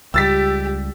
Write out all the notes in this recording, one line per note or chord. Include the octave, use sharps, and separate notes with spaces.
C#2 G3 G4 E6 A6 B6